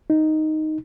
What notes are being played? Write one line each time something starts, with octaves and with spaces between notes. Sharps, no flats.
D#4